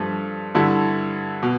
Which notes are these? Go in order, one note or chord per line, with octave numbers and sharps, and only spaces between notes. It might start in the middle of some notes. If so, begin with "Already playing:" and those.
Already playing: G2 F3 A3
G2 D3 A3 E4
B2